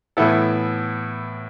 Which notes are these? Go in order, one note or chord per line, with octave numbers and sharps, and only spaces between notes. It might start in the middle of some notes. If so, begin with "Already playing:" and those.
A2 E3 B3 E4 A4